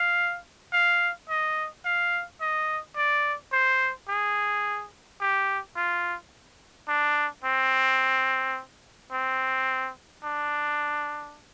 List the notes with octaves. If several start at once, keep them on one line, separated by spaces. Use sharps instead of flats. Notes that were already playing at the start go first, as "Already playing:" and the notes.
Already playing: F5
F5
D#5
F5
D#5
D5
C5
G#4
G4
F4
D4
C4
C4
D4